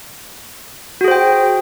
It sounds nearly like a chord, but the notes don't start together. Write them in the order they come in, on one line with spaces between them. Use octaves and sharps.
F#4 G#4 C5 G5